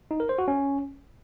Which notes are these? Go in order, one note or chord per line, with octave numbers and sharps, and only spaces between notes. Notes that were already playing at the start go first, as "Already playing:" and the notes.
D#4
A#4
C5
F#4
C#4